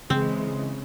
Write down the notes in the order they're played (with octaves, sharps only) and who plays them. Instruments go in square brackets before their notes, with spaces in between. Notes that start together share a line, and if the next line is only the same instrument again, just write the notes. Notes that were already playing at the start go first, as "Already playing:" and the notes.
[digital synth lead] C#3 [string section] E3 G#3 [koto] C4